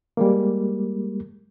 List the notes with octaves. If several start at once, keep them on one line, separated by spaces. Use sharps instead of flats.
G3 G#3 A#3